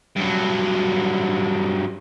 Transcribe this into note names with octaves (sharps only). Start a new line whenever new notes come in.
G2 F#3